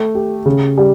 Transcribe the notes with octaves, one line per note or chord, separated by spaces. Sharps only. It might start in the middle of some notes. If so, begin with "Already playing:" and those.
Already playing: A3
G4
C#3
G3